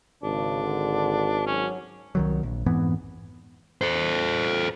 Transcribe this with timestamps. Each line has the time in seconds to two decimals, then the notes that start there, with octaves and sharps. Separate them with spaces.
0.23 G#1 C#3 D4
0.63 D3
1.46 F#3 C#4
2.15 C2 D#3 F#3
2.43 A#1
2.66 F2 G#2 E3 B3
3.81 A4 C5